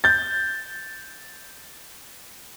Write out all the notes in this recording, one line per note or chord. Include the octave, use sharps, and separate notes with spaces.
G6 A6